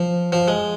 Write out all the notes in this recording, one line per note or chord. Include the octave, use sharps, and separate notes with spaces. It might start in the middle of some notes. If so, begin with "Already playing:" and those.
Already playing: F3
F3
G#3